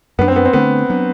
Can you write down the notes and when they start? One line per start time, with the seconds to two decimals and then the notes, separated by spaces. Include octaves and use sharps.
0.19 F#2 F#3 A3 B3 D4
0.28 C4
0.36 B3
0.46 C4
0.53 D3 A3 B3 D4
0.90 F#3 B3 D4